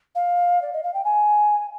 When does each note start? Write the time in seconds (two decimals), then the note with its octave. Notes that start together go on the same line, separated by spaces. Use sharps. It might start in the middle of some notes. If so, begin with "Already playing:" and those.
0.15 F5
0.62 D5
0.73 D#5
0.83 F5
0.94 G5
1.05 G#5